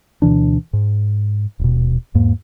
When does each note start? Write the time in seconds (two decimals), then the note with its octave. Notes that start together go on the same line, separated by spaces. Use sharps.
0.22 D2 B2 E3 D4
0.73 G#2
1.59 D#1 B2
2.14 E2 G#2 A#3